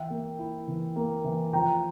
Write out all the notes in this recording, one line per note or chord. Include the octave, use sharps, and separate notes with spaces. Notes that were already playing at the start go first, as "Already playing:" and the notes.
Already playing: E3 E5 G5
A#3
E4
E3
A#3
E3
F3 G5 A#5